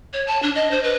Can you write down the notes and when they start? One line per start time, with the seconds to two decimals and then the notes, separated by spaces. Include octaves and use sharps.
0.13 C#5
0.27 A5
0.43 D4
0.55 D#5
0.71 C5
0.84 B4